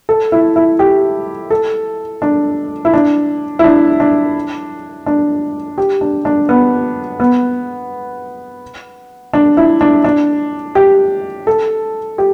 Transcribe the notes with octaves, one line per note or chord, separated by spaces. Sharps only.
A4
E4
E4
G4
A4
D4
E4
D4
E4
D4
D4
D4
G4
D4
D4
B3
B3
D4
E4
D4
D4
G4
A4
G4